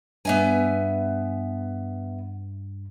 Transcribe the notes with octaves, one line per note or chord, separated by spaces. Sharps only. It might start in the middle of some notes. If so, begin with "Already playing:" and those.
G2 B3 E5 G#5